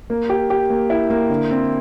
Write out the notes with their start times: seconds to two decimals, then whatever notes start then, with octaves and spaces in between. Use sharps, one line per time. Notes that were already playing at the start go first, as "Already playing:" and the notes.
0.10 A#3
0.29 G4
0.50 G4
0.70 A#3
0.90 E4
1.10 A#3
1.30 D3
1.50 C4